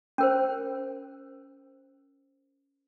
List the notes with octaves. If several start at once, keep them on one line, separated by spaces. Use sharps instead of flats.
C#4 A#4 C5